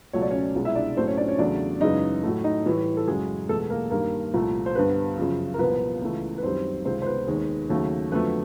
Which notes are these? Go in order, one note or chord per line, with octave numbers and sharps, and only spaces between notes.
C#2 B2 F#3 A3 C#5
D5
C#4 C#5
C2 B2 G#3
E4 E5
D4 D5
A2 F#3 A3 C4 C5
C#4 C#5
D4 D5
C#4 C#5
E2 C#3 F#3 A3 D4 D5
F#2 C#3 E3 G#3 D#4 D#5
A2 F#3 A3
D#4 D#5
A2 E3 G3
A4
F#2 C#3 F#3 G#3 G#4
E2 B2 G#3 A3 A4
A#3 A#4
G2 D#3 G3 A#3 A#4
C2 A#2 F3 A3
C5
G2 D3 G3 B3 B4
F#2 C#3 F3
A#4
C2 A#2 F3 B3 B4
C#2 C#3 E3 A3
B4
F#2 D#3 G3 C4 C5
C#2 C3 D#3 G#3 C4 C5
C5
B3 B4
D#2 D#3 G#3
D#2 C#3 F#3 A3
F2 D3 F#3 A3 B3 B4